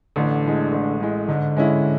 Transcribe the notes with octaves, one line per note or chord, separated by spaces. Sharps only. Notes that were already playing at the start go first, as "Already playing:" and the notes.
A1 D3
A2 G#3
A1
A2 G#3
G#2 D3
G#3 C#4 E4